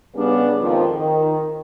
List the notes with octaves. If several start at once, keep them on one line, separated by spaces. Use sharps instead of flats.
C#3 G3 B3 C#4 D4
F2 G#2 D#3 F3
D#3